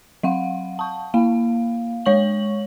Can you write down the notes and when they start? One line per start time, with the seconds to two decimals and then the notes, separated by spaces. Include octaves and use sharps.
0.23 F#3 F5 F#5
0.79 A5 C#6
1.14 A#3 F5
2.06 G#3 C#5 C#6 F#7